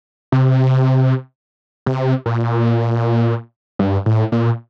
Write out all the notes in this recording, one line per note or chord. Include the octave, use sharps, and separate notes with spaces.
C3
C3
A#2
G2
A2
A#2